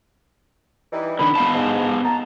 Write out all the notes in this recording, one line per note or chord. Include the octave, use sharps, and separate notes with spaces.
E3 G3 D#4
D3 D#3 D4 B5
B3 F5 A5
G#2
A5 A#5